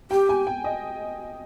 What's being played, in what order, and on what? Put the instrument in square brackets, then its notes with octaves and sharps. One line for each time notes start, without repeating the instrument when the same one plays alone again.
[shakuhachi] G4 [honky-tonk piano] G5
[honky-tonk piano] G#5
G5
D#5